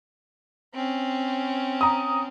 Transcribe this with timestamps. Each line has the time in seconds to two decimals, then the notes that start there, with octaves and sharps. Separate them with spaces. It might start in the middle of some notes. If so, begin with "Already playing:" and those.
0.74 C4 C#4
1.81 A#5 D#6